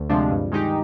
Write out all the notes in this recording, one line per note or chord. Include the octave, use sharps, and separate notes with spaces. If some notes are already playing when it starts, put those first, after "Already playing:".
Already playing: D2
C3 F3 G#3 D4
G2
D#3 G#3 D#4 G4